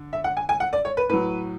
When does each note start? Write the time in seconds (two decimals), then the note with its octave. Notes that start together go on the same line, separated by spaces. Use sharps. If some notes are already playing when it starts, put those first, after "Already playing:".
Already playing: D3
0.13 E5
0.24 F#5
0.37 G#5
0.49 G#5
0.60 F#5
0.73 D5
0.85 C#5
0.97 B4
1.10 A2 F#3 B4